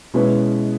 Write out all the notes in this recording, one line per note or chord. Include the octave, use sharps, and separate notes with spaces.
B2 G#3 C#4 E4 B4